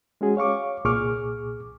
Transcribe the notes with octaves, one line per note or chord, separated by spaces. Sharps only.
G#3 C#4 F#4 G#4
C#5 F5 C#6 D6
C2 A#2 G#4 C#6 D6 F6